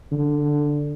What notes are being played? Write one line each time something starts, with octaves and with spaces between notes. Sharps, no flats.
D3